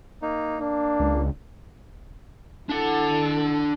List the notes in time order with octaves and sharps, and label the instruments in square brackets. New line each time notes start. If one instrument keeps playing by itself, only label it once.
[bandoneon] A#3 D#4
[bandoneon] A#3 [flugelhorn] D4
[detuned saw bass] C#2
[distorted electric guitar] D4 F#5 [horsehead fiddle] E4 A4